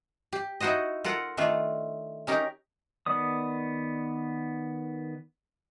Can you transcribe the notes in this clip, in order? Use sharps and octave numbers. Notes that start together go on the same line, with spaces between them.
G4
D#4 E4 F#4 C5 D#5
F4 A4 A#4 F#5
D#3 A3 D4 F4
C#4 D#4 G4 A#4
D#3 B3 D5 D#6